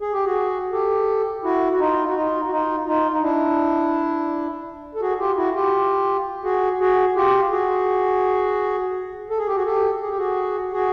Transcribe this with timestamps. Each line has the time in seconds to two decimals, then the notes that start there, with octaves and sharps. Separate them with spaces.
0.01 G#4
0.13 G4
0.25 F#4 G#4
0.72 G4 A4
1.44 E4 F#4
1.72 F#4
1.79 D#4 F4
2.09 F#4
2.15 D#4 F4
2.46 F#4
2.51 D#4 F4
2.87 D#4 F4
3.12 D#4
3.22 D4 E4
4.95 A4
5.01 F#4 G#4
5.19 F4 G4
5.37 E4 F#4
5.55 F4 G4
6.44 F#4 G#4
6.80 F#4 G#4
7.16 F4 G4
7.51 F#4 G#4
9.30 A4
9.39 G#4
9.47 G4
9.56 F#4 G#4
9.66 G4 A4
10.02 G#4
10.10 G4
10.18 F#4 G#4
10.73 F#4 G#4